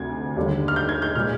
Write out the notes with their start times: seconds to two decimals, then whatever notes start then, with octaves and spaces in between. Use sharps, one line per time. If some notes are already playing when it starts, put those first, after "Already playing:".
Already playing: D2 C3 G#6
0.36 D#2 D3 G3
0.68 F6
0.76 G6
0.89 G#6
1.02 G6
1.15 A#2 G#3 F6